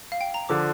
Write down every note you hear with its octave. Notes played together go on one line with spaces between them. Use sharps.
F5
G5
A#5
D3 F3 D6